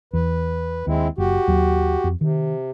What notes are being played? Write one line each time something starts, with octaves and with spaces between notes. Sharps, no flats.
E2 B4
D#2 G#3 C4 E4
F#1 F#4 G4
D#2 F#3
F2
C3 D#3